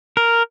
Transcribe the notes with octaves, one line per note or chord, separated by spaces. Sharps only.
A#4